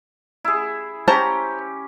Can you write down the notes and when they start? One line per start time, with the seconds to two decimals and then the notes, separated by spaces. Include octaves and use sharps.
0.44 E4 G#4
1.08 C#4 G4 C5 A5 A#5